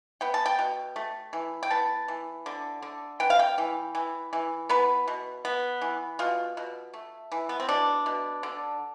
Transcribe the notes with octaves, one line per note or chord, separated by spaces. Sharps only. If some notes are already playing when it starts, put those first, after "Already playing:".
B3 G5
A5
G5
B2
A3
E3
G5
B3 A5
E3
D3
D3
B3 G5
F5
G5
E3
E3
E3
B3 B4
B2
B3
E3
B2 F4
B2
A3
E3
B3
C4
B2 D4
B2
D3